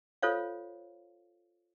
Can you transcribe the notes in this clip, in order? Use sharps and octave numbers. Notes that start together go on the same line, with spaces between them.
F4 A4 C5 C#5 F5